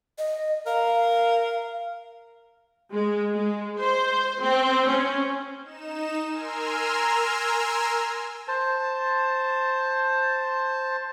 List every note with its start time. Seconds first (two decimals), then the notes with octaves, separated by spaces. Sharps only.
0.18 D#5
0.67 A#4 F5
2.93 G#3
3.35 G#3
3.79 C5
4.42 C4
4.88 C#4
5.63 D#4 E7
6.29 A#4 G#5 A#5 C6 E6 F6
8.48 C5 A5